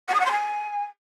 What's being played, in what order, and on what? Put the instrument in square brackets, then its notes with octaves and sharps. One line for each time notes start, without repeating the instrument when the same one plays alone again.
[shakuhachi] F#5
D#6
F#5
C6
G#5